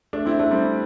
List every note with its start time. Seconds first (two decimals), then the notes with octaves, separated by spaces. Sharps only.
0.13 A3 D4
0.26 C4 E4
0.39 A3 D4
0.51 G3 C4